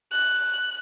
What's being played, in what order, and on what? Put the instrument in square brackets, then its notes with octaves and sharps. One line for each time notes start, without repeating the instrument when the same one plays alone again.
[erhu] F#6